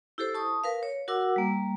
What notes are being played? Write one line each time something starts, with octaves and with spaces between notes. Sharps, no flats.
E4 G4 A4 C5
A5 C#6 D#6
A#4 B4 F5
C#5
F#4 A#4 F#5 D6 E6
G3 A#3